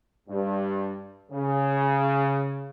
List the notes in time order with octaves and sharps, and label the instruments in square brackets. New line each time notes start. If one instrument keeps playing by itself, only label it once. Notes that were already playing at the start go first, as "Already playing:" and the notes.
[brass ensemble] G2
C#3